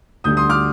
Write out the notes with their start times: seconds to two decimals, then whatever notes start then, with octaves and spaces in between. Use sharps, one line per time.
0.24 D2 D3 G3 D#6 G6
0.37 C6 D#6
0.50 D6 F6